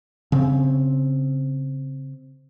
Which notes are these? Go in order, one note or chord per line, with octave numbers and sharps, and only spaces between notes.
C#3 C4